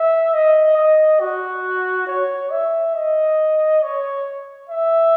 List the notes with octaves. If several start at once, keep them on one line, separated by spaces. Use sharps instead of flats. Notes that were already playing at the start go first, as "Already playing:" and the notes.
Already playing: E5
D#5
D#5
F#4
C#5
E5
D#5
C#5
E5